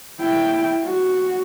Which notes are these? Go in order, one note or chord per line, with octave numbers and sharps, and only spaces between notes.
E4 G5
F#4